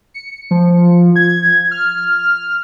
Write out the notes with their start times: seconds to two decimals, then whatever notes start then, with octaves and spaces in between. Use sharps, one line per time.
0.14 C#7
0.51 F3
1.16 G#6
1.71 F6